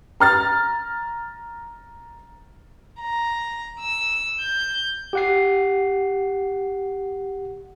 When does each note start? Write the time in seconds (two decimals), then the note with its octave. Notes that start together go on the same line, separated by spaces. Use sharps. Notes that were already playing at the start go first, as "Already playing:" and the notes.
0.20 A#5 F6 A6
3.00 A#5
3.79 E6
4.39 G6
5.13 G4 F#5 C7